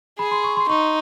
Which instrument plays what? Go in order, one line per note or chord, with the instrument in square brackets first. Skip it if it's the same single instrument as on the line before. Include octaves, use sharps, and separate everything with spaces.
[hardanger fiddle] G#4 [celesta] B5
[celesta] C6
C#6
C6
[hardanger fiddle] D#4 [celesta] C#6